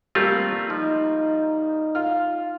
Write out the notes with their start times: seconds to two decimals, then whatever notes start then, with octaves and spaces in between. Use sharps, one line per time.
0.15 G3 A3 A#3 C4 F4
0.70 F3 D#4
1.95 F4 F6